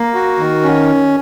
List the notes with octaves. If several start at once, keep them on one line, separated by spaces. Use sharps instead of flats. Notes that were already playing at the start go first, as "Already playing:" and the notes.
Already playing: A#3
F#4
D#3
C#4